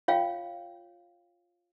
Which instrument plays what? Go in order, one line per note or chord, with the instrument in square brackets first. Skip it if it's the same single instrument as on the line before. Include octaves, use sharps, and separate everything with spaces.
[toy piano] F4 C#5 F5 G5